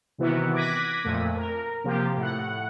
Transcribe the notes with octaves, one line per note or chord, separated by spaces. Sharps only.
C3 D#3 E3 B3 E4 F#4
D6 F#6 G#6 A#6 B6 D#7
F2 A#2 A3
A#4
C3 F3 A#3 F4 G4
A2 F#5